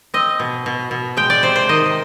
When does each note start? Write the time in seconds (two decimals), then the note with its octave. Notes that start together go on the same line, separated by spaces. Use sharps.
0.14 C4 D#5
0.40 B2
0.66 B2
0.91 B2
1.17 G#3 G5
1.30 D5
1.43 C3 C5
1.56 C5
1.69 D#3 D#5